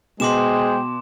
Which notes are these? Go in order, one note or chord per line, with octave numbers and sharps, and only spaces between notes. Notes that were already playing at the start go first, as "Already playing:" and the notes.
B2 G#3 G#4 C5 G5 C6 D6 E7